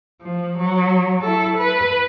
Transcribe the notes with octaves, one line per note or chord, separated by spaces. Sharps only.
F3
F#3
E4 A4
B4